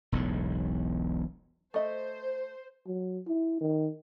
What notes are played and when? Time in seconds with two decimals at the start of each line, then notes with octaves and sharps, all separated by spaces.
0.12 E1 B1 E2 A2
1.74 A3 C5 D#5 E5
2.87 F#3
3.27 E4
3.61 D#3